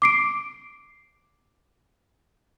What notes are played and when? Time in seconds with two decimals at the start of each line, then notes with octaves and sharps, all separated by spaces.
0.02 D6 C7 D7